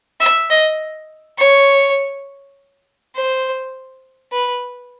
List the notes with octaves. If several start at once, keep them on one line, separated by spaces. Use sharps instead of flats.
E5
D#5
C#5
C5
B4